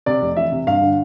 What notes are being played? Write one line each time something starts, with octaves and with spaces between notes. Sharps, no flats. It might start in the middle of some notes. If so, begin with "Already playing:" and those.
C3 D5
F1
E3 E5
C3
G2 F5
D3